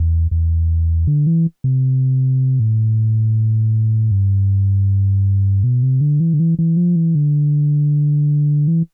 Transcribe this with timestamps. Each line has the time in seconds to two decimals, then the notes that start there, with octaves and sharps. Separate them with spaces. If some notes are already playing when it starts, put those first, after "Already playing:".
Already playing: E2
0.31 E2
1.07 D3
1.27 E3
1.64 C3
2.60 A2
4.11 G2
5.64 B2
5.83 C3
6.01 D3
6.20 E3
6.34 D3
6.40 E3
6.59 E3
6.77 F3
6.96 E3
7.15 D3
8.68 E3